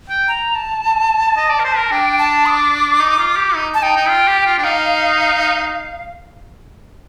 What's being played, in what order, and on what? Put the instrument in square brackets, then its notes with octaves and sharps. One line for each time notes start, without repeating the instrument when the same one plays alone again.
[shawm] G5
[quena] A#5
A5
[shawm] D#5
D5
A#4
C5
A#4
[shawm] D4 [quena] G5
[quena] A5
D#6
D6
[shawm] D#4
F4
G4
D#4
[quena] A5
[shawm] D#4 [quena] G5
[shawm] D#4
F4
G4
F4
D4
[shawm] D#4 [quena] F5